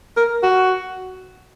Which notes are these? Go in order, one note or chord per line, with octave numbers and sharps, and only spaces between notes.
A#4
F#4